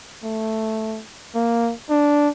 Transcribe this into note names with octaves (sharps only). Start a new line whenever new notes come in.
A3
A#3
D4